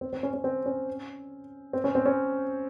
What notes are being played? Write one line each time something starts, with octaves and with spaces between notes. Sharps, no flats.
C4
C4
C#4
C#4
C4
C#4
C4
C#4
C4
C#4